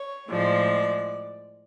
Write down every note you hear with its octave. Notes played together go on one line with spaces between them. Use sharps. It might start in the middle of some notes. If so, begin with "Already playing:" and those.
Already playing: C#5
A2 F3 G#3 D5